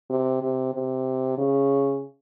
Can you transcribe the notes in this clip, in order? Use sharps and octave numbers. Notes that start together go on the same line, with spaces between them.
C3
C3
C3
C#3